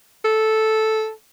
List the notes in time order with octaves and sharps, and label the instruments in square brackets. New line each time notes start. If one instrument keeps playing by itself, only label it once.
[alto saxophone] A4